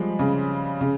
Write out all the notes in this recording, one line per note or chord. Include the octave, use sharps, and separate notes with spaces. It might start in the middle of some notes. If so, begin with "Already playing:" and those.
Already playing: F3 G3 G#3
C#3
C#3